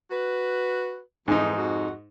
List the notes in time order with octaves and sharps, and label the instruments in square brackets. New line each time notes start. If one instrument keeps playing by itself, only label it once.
[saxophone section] F#4 B4
[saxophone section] F2 E3 [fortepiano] G#2 D#4
[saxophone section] F2 F#4